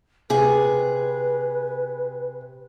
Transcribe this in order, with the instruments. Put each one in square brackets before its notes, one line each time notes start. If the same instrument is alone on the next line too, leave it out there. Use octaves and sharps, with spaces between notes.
[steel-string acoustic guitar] C3 G#4 [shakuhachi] B4